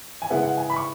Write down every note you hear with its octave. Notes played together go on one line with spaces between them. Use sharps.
G#5
C#3 G#3 B3 E4 F#5
F#5
G#5
B5
C#6